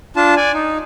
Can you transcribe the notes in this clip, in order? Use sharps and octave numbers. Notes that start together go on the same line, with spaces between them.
D4 F4 A5
D5 G#5
D#4